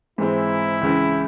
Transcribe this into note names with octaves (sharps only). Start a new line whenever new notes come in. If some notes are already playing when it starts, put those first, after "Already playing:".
G#2 E3 G#3 C4 E4
C#2 C#3 E3